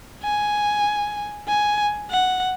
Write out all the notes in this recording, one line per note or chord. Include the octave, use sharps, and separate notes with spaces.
G#5
G#5
F#5